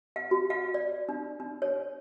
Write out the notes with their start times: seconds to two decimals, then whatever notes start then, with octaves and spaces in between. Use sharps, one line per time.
0.16 F5
0.31 F#4
0.50 F5
0.74 D5
1.09 D4
1.40 D4
1.62 C#5